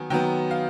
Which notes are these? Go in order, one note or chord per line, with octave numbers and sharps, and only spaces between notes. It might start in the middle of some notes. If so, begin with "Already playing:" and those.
Already playing: D#3 F#3 B3 G#5
D#3 F#3 B3 G5
F5